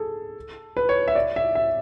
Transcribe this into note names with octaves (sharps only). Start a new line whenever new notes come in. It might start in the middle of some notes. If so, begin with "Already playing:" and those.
Already playing: G#4 A4
B4
C#5
E5
D5
E5
E5